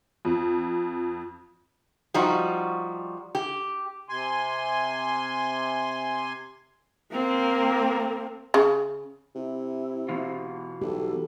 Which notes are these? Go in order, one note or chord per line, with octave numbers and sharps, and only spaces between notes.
F2
F3 G3 D#4 F#4
G4
C3 G#5 C6
A#3 C4
C#3
C3 E4
B2 E3 F4
B1 G4 A4